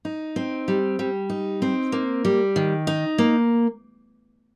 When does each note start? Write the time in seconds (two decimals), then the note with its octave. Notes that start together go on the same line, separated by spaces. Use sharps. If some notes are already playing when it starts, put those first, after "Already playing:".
0.05 D#4
0.36 C4
0.68 G3
0.99 G3
1.30 D#4
1.62 C4
1.92 A#3
2.25 G3
2.56 D#3
2.87 D#4
3.18 A#3